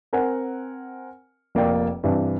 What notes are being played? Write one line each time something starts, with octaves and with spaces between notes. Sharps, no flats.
C4 A#4 F#5 G#5
F1 A#3 D5 G5
G2 C3 E3 D4